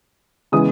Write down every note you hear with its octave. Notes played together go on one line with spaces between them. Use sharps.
C#3 E3 G#3 B3 D#6